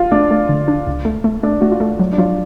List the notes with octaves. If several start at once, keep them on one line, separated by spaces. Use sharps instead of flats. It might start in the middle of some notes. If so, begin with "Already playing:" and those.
Already playing: F4
A3 D4
A3
D3
D4
C#2
A3
A3
A3 D4
A3 F#4
F4
A3
F#3
D4
F#3 F4